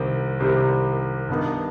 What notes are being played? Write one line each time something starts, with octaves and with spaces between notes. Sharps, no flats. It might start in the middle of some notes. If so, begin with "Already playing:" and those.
Already playing: C2 C3 D#3 G3 C4
C2 C3 D#3 G3 C4
G2 D#3 B3 D#4